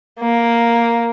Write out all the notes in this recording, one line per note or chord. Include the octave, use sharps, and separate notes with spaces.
A#3